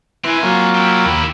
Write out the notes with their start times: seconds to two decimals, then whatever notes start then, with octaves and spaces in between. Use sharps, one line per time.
0.24 C4 E4 B4 G#5 C6
0.43 F#3 A#3 F4
0.75 E4 G4
1.06 D#2 B5